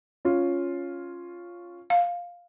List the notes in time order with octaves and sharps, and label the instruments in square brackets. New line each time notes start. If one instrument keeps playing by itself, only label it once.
[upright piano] C#4 F4
[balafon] F5